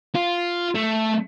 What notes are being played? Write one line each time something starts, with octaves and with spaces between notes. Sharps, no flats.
F4
A3